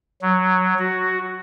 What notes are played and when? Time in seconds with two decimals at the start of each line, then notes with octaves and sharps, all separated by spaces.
0.22 F#3
0.79 F#4